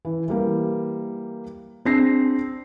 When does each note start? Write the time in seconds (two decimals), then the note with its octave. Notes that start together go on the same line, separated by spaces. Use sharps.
0.05 E3
0.28 E3 G3 A#3
1.85 C4 D4 G#4 A#6 C7